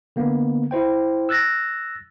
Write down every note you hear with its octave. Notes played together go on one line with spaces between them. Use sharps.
D3 A#3 B3
E4 C5 G5
E6 F#6 A6 A#6